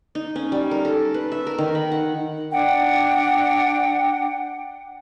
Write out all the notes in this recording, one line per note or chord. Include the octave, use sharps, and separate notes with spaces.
D#4
C#4
G3
A#4
A4
B4
E5
A#4
D#3
B5
F#5
D4 F#5 G5